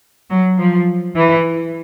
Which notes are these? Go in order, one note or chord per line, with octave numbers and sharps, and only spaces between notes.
F#3
F3
E3